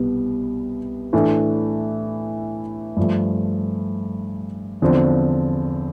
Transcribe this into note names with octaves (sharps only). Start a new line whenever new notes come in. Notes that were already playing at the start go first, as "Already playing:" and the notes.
Already playing: C2 B2 G3 B3
A2 E3 A3 D4 A4
G2 F3 A3
E2 D3 F3 C4